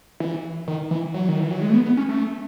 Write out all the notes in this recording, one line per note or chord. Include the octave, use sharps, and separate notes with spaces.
E3
D#3
E3
F#3
D#3
E3
F#3
G#3
A3
B3
B3
C#4
A3